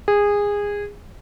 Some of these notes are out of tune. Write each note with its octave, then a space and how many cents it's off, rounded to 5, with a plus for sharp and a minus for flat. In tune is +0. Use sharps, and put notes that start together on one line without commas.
G#4 -20